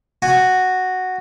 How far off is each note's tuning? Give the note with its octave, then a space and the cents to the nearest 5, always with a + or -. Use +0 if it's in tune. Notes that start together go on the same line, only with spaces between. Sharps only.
F#4 +0 G#5 +0